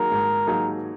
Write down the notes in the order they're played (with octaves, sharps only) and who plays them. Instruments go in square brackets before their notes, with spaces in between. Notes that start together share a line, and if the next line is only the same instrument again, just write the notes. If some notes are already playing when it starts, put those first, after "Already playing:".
Already playing: [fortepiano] F#3 A#3 D#4 G#4 [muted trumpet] A#4
[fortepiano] G#2
F#3 A#3 D#4 G#4